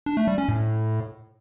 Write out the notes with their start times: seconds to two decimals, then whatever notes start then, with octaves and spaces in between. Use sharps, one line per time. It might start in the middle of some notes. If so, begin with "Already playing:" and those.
0.06 D4
0.17 A3
0.27 G3
0.38 C#4
0.49 A2